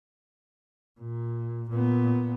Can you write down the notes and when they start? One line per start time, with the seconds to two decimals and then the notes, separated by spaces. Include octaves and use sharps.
1.00 A#2
1.69 A#2 B3